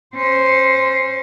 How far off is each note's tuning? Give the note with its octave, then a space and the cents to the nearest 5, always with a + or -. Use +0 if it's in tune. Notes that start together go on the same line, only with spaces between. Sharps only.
C#4 -25 C5 +0